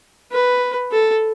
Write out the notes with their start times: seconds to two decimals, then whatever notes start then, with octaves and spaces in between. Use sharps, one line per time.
0.32 B4
0.92 A4